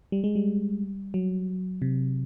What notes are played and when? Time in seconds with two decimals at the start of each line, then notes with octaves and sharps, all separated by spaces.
0.12 G3
0.24 G#3
0.36 G3
1.14 F#3
1.82 C3